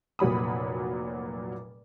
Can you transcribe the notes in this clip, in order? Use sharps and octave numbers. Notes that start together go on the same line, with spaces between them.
F1 A#2 F#3 B5 D#6